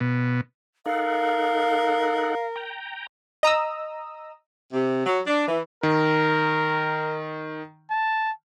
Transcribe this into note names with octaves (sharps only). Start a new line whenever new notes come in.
B2
D#4 A4 A#4 F5 F#5
G5 A#5
D#5 A#5 D#6 E6
C3
F#3
D4
E3
D#3 A#4
A5